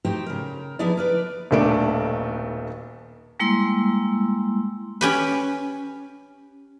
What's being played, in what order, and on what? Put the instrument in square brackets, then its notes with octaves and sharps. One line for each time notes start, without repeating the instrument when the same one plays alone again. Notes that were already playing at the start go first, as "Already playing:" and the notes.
[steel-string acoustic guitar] A2 D#4 F#4 G4 C5 G5
C#3 A#4
F3 B3 D#4 E4 G#4 D5
A#4 B4 D5
[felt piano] D#1 B1 A3 D4 D7
[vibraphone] G3 G#3 A#3 E4 C6 E6
[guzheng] C#4 G4 B4